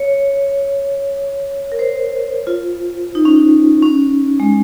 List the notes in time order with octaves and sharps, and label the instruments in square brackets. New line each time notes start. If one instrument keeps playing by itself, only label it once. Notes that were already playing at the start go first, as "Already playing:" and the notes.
Already playing: [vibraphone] C#5
A#4
C5
F4
D#4
C#4
D#4
C#4
G#3